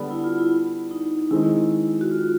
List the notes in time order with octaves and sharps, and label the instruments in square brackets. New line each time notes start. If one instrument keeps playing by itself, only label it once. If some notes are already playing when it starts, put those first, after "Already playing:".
Already playing: [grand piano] D3 G3 B3
[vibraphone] E4
F4
E4
D#4
[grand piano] D#3 G#3 C4 D#4 [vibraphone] E4
[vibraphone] F#4
F4